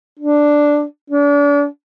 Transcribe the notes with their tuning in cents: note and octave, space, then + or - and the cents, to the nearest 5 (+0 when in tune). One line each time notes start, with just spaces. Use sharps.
D4 +0
D4 -35